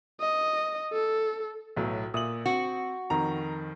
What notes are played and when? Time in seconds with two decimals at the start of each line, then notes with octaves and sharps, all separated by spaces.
0.20 D#5
0.93 A4
1.77 B1 A2 F#3 B3
2.14 A#2 E5 D#6 F#7
2.46 C4 F#4
3.10 F2 D#3 A#5